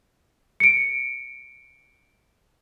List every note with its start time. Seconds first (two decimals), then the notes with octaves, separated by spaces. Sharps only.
0.60 C#7 D7